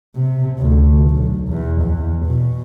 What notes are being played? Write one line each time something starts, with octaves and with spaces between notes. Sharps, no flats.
C3
D2
B1
E2
E2
B2